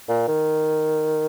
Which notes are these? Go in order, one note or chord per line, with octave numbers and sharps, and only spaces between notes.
A#2
D#3